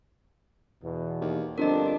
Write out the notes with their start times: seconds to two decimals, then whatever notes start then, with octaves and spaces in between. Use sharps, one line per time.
0.83 E2 B2
1.22 D#2
1.58 G1 F3 C4 D4 A#4 D#5